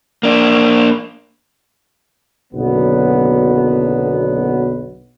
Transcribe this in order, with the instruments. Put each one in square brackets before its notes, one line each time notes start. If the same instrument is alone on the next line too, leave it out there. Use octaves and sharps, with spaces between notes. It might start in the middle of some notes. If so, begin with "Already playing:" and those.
[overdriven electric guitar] A#3 D4
[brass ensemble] F#1 B1 D3 F#3 B3